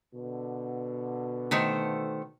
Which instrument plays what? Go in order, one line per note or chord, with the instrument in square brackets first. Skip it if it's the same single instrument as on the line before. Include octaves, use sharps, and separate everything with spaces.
[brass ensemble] B2 D3
[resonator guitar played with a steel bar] D#3 A3 C5